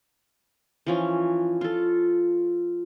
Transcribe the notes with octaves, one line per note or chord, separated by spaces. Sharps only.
E3 F3 C#4
F4 A4